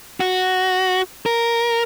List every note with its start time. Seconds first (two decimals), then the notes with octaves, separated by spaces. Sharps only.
0.20 F#4
1.26 A#4